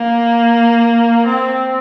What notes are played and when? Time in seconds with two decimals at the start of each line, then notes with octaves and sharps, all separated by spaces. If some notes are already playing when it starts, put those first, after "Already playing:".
Already playing: A#3
1.27 C4